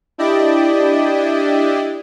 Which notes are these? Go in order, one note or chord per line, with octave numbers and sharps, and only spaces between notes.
D4 E4 G4 D5 D#5